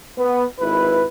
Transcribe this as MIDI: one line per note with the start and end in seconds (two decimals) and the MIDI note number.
0.18 0.45 59
0.60 1.06 32
0.60 1.06 64
0.60 1.06 71